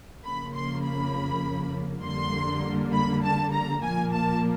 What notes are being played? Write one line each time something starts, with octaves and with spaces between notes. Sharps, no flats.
F2 C#3 F3 A#3 B5
C6
B5
F2 D3 G3 A#3 C6
B5
A5
A#5
A#2 F3 A#3 G#5
A5